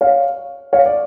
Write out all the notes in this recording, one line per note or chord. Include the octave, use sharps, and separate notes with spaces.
C#5 F5
C#5 F5
D5